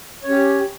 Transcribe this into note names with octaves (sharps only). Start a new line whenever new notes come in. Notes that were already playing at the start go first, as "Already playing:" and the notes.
C#4 G4 C#5